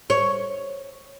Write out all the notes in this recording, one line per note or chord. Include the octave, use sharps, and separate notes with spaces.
C#5